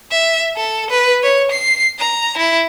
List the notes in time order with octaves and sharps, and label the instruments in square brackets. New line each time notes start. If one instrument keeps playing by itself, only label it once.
[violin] E5
A4
B4
C#5
C7
A#5
E4